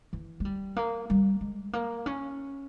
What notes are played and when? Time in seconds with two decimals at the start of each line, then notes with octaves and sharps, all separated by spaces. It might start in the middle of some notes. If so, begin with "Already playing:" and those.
0.13 E3
0.40 G#3
0.45 G3
0.76 A#3
1.10 G3
1.41 G#3
1.73 A#3
2.06 C#4